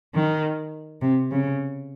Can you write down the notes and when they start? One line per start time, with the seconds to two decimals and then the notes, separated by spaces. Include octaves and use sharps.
0.14 D#3
1.02 C3
1.31 C#3